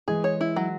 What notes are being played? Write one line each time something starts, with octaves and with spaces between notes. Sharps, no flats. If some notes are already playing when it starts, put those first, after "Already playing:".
E3 G#3 G#4
C#5
E4
F#3